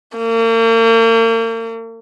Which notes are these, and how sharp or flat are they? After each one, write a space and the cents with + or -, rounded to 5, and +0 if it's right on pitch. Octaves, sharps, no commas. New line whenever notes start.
A#3 -40